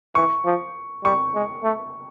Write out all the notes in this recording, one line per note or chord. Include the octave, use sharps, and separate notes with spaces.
E3 C#6
F3
G3 C#6
G#3
A3